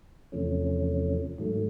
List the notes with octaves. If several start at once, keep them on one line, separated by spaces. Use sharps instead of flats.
E2 C3 F3 A3 C#4
G#2 D#3 F#3 A3